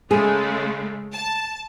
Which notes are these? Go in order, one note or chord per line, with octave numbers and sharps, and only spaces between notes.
C#3 G#3 A3 G#4
A5